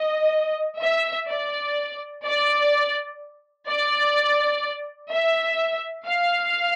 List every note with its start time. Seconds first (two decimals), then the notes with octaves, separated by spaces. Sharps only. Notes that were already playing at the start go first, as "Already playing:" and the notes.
Already playing: D#5
0.82 E5
1.29 D5
2.25 D5
3.69 D5
5.12 E5
6.07 F5